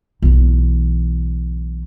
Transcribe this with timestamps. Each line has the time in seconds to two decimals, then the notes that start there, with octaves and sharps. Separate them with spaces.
0.22 B1 E3